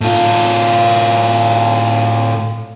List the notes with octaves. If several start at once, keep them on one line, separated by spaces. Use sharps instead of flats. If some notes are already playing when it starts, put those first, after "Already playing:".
A2 F4